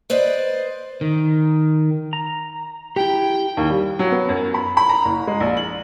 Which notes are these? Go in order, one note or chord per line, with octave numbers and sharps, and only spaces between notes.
B4 C5 D5 D#5
D#3
A#5
E4 G4 G5
D#2
G3
F#3
B3
F#2
B5
B5
A#5
F#1
G#3
A#1
F#7